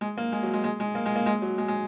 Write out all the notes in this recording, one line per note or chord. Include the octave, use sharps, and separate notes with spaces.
G#3
A#3
G#3
F#3
G#3
G#3
G#3
A#3
G#3
A#3
G#3
F#3
G#3
G#3